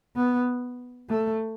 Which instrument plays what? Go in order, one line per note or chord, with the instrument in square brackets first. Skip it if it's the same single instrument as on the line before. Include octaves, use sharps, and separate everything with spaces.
[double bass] B3
A3